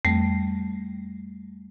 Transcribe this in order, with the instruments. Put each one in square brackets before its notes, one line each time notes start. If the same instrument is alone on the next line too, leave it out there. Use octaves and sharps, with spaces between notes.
[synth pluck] F2 [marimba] G3 A3